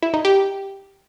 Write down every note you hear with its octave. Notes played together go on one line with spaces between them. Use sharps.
E4
D#4
G4